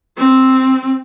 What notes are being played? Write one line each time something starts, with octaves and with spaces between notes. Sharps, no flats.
C4